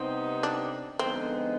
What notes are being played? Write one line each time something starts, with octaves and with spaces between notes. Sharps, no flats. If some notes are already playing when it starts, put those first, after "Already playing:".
Already playing: C3 G3 B3 C4 D#4 G4
D4
D3 F3 G#3 B3 C4 D#4